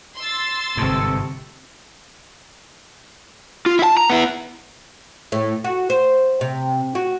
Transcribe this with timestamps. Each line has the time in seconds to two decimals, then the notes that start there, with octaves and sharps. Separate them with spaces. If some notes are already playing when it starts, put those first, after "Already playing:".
0.17 C6 E6 A6
0.77 G1 G#2 C3 A4 C#6
3.66 F4
3.79 E4 A5
3.97 A#5
4.10 B3 E4
5.32 A2
5.64 F#4
5.90 C5
6.41 C3
6.95 F#4